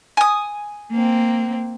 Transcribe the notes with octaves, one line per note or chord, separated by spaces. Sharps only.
G#5 D#6
A#3 C4